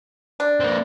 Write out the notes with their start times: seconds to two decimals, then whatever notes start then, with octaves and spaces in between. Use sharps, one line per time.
0.40 D4
0.60 A#3 C4